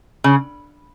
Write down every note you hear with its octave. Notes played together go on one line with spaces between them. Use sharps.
C#3